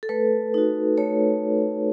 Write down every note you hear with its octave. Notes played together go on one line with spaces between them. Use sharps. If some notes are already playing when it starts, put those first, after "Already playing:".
A4
A3 B4
D#4 F#4
A3 C#5